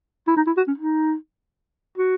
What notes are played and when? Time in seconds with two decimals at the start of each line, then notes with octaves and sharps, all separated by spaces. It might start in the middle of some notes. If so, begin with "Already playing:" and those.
0.27 E4
0.37 D#4
0.47 E4
0.57 F#4
0.67 C#4
0.78 D#4
1.98 F#4